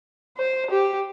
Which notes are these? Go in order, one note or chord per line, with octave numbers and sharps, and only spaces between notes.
C5
G4